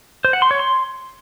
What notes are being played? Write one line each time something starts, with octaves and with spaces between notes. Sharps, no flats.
C5
F#5
C6
C#5
C6